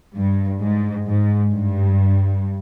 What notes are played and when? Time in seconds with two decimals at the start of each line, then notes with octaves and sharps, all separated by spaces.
0.16 G2
0.61 G#2
1.06 G#2
1.52 G2